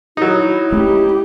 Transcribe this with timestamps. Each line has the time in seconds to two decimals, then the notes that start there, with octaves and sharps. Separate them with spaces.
0.17 F#3 D#4 E4
0.72 G#3 A3 C#4 G4